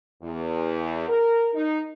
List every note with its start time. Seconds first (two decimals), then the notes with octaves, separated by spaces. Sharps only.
0.23 E2
1.09 A#4
1.54 D#4